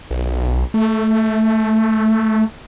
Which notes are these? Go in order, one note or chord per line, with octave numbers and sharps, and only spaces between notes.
B1
A3